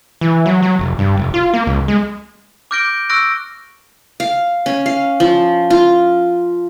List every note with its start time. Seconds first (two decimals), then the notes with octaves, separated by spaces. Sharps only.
0.21 E3
0.46 F#3
0.63 F#3
0.79 F1
0.99 G2
1.18 F1
1.34 F4
1.54 A#3
1.67 C#2
1.88 G#3
2.71 D6 F6 G6 A#6 D7 G7
3.09 C#6 E6 F#6 A#6 D7
4.20 F5
4.66 C#4
4.86 F5
5.20 F3
5.70 F4